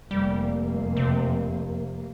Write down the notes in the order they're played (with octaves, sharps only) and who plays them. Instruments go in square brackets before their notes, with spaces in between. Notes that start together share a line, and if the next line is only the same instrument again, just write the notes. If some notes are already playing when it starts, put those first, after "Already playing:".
[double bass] F1 A#3 [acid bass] G3
[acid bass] C3